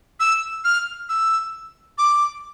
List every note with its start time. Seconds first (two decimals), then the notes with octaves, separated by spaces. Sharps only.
0.20 E6
0.65 F6
1.09 E6
1.98 D6